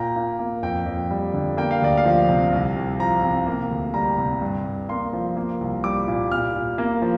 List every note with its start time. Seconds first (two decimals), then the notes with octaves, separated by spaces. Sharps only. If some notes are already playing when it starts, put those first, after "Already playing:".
Already playing: A#2 A#3 G5 A#5
0.16 A#2
0.39 A#3
0.63 F2 G5
0.86 F2
1.10 G3
1.34 D3
1.57 A#3 G5
1.71 F5
1.82 D2 D5
1.97 F5
2.06 F3
2.29 C3
2.52 C2
2.76 C2
3.00 F3 A#5
3.23 C3
3.47 A#3
3.71 D2
3.94 G3 A#5
4.18 C3
4.42 G2
4.66 G2
4.89 A#3 C6
5.13 F3
5.37 A#3
5.61 C2
5.84 G3 D6
6.08 A#2
6.31 A#2 F6
6.55 A#2
6.78 A#3
7.02 F3